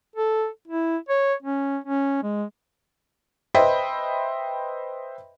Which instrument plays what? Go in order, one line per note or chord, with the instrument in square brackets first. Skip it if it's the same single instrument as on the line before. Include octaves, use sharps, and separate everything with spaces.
[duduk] A4
E4
C#5
C#4
C#4
G#3
[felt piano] B4 C5 D#5 E5 G5 B5